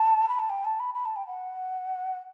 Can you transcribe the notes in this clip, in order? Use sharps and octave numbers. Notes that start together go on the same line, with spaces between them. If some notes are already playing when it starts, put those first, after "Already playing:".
Already playing: A5
B5
A5
G5
A5
B5
B5
A5
G5
F#5